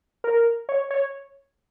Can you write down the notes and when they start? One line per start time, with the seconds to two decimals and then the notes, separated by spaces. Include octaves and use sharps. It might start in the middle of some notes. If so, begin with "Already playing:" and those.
0.24 A#4
0.69 C#5
0.91 C#5